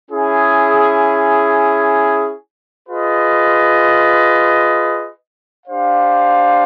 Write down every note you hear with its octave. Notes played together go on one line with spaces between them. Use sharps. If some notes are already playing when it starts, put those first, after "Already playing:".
C#4 E4 G#4
F4 G#4 B4 D#5
D4 G4 C5 F5